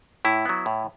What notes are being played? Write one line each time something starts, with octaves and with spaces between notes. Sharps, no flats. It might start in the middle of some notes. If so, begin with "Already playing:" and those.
A2 E4
F#3 B3
A2